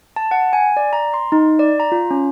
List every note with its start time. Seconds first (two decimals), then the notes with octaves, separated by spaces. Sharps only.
0.16 A5
0.31 F#5
0.53 G#5
0.77 D5
0.93 A#5
1.14 C6
1.32 D#4
1.59 D5
1.80 A#5
1.92 F4
2.11 C#4